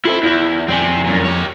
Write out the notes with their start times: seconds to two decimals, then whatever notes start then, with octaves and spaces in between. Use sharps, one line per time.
0.05 E4 F4 A4 C5
0.23 E2 E4 E5
0.68 F2 C3 C4 D5 G#5
1.05 F#2 A#2
1.24 G4 C#5